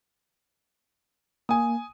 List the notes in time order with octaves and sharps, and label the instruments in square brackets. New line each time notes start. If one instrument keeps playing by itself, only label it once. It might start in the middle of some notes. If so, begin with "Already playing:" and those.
[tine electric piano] A#3 [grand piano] G#5 D#6